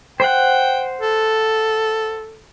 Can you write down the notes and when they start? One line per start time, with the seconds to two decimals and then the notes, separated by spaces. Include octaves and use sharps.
0.20 C5 F#5 G5
1.01 A4